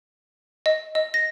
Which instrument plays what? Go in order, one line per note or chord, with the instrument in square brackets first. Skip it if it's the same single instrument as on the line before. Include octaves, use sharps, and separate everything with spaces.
[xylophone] D#5
D#5
A#6